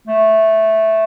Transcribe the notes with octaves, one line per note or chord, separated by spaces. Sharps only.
A3